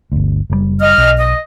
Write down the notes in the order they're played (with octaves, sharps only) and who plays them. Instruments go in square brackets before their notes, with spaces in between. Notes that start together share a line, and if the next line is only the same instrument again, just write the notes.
[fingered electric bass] G1 D2
F#1 A#2 G3
[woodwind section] D#5 F6
[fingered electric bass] B1
[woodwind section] D#5